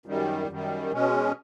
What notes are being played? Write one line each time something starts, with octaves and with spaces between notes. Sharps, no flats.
F#2 D#3 G3
F#2 D#3 G3
B2 G#3 C#4